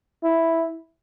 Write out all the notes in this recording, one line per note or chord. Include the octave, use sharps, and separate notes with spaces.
E4